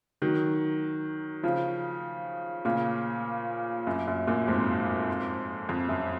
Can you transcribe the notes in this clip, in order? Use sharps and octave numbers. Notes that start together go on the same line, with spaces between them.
D#3 F#3
C#3 F3
A#2 C#3
F#2
F#2
F#2 A#2
F2 G#2
F2
F#2